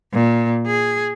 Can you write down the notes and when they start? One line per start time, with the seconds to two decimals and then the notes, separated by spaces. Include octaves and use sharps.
0.13 A#2
0.67 G#4